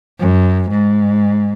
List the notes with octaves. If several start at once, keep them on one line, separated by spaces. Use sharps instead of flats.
F#2
G#2